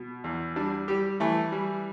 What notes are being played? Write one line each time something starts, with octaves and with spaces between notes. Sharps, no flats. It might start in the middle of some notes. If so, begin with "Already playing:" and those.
Already playing: B2
E2
G3 D4
G3 G4
E3 A3
G3